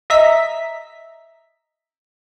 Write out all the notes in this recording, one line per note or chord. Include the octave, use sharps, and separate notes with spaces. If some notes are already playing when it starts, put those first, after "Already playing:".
D#5 E5 A#5 B6